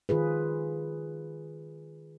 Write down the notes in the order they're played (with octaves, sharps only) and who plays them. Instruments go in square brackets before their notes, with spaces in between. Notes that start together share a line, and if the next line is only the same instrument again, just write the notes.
[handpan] D#3 F4 G#4 B4